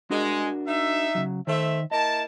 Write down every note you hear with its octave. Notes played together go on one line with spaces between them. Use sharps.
G#3 D4 F#4 A#4
D#4 E5
C#3 F#3
D#3 A3 C5 E5
A#3 E4 D#5 A5